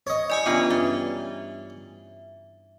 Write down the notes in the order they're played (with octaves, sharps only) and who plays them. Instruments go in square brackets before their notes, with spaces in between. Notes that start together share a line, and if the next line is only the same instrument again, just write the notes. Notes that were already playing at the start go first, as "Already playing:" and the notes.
[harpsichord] C#5 D#5
[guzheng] G3 E4 [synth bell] D5 G#5 D#6
[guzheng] C#3 E3 G3 [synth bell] B3 D4 F4
[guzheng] G2 [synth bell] E5